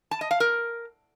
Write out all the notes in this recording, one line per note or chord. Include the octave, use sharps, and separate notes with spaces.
A5
D#5
F5
A#4